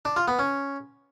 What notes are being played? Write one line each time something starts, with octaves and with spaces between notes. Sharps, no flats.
D4
F4
B3
C#4